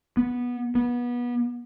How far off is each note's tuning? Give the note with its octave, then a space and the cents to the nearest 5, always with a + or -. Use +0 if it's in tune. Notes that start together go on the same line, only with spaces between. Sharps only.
B3 -15
B3 -25